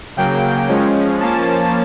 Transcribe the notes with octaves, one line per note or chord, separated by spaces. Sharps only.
C#3 F#3 A#3 G5
F3 G#3 C#4
F3 A#3 C#4 A5